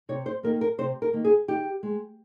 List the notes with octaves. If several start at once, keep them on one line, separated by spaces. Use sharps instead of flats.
C3 C#5
C5
D#3 A#3 A#4
A#4
C3 C5
A#4
D#3 A#3
G#4
D#3 G4
G#3